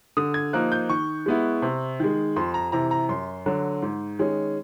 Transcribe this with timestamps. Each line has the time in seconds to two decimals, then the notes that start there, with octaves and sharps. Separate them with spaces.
0.17 D3 D#6
0.34 G#6
0.53 F3 A#3 D#4 F#6
0.72 G6
0.89 D#3 C#6
1.26 G#3 B3 E4
1.62 C3
2.00 D#3 G#3
2.36 F2 C6
2.54 A#5
2.72 C3 E3 A#5
2.91 A#5
3.09 F#2 C6
3.46 D3 F#3
3.82 G#2
4.19 D#3 G#3 C#4